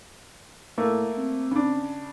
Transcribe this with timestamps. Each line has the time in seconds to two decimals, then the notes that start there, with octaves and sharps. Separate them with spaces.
0.78 A2 A3 A#3
1.18 C4
1.51 C#3 D4